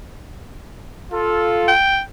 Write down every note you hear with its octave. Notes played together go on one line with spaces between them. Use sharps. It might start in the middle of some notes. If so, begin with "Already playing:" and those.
F4 A4
G5